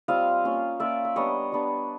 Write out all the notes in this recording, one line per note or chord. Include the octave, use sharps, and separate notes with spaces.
G3 C4 F4 D#5 F5
A#3 C#4 F4
A#3 C#4 F4 D5 E5
E5
G3 B3 D4 C#5 D#5
G3 B3 D4